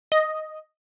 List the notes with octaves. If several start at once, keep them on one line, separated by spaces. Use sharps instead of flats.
D#5